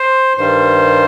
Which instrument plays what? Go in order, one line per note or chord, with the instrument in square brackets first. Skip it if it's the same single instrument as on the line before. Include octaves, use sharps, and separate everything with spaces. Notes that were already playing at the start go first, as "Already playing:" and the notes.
Already playing: [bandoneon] C5
G2 D#3 G3 C5